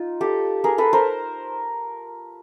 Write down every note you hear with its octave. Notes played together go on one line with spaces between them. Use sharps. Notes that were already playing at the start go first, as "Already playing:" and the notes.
Already playing: D#4 F4
G4 A4
G#4 A#4
A4 B4
A#4 C5